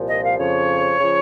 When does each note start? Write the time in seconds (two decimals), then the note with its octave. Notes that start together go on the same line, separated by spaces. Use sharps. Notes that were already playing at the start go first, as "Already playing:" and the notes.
Already playing: C2 A#2 F3
0.09 D#5
0.24 F5
0.39 F2 C#3 F3 C#5
1.00 C#3 F3